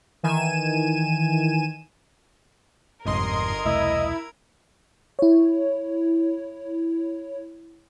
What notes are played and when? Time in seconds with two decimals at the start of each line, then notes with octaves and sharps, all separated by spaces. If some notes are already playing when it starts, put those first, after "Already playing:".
0.23 D#3 E3 G#5 D#7 E7
3.06 G1 F2 G#2 C3 A#4 D#5 C6 G#6
3.66 E1 C2 A3 E4 D#5
5.19 E4 C#5